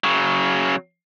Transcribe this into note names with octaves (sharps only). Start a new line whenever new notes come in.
C#3 F#3